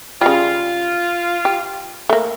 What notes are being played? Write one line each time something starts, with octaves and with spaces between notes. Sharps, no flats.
C#3 G3 F4
G4
A3 A#3